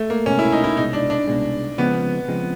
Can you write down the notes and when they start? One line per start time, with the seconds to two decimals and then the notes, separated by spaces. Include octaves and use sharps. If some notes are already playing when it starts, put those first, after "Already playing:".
Already playing: A3
0.10 A#3
0.26 C2 B2 G#3 C#4
0.39 E4
0.52 D#4
0.64 E4
0.76 C2 B2 G#3 D#4
0.93 D4
1.10 D4
1.28 C2 B2 G#3
1.78 C#3 F3 G#3 B3 C4
2.28 C#3 F3 G#3 C4